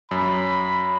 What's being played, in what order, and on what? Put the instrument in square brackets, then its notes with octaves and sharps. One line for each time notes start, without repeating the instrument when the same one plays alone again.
[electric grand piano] F#2 [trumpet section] B5